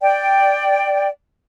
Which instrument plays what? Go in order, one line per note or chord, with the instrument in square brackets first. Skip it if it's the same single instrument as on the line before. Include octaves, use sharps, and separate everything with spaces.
[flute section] D5 G5